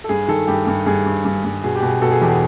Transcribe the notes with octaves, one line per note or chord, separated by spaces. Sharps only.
A4
G2 G#4
D#3 A4
G2 G4
G2
G2 G#4
G2
G2
G2
B2 G#4
G4
B2
G#4
B2 A4
G#4
E2 G4
G#4